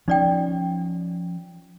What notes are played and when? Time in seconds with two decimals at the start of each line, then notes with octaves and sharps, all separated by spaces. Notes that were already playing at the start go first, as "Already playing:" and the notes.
0.08 F3 C#4 D#4 D5 G5